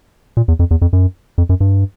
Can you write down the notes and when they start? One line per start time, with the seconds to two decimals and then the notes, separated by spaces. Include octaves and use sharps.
0.37 A#2
0.48 E2
0.59 F2
0.71 E2
0.82 F2
0.93 F#2
1.38 F2
1.49 F#2
1.60 G2